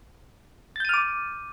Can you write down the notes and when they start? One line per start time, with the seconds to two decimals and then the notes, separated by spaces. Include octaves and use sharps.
0.76 A6
0.80 G6
0.85 D#7
0.89 F6
0.94 D6